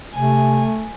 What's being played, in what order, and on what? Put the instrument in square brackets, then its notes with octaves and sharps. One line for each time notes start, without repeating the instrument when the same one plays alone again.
[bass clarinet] C3 [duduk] A3 [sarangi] G#5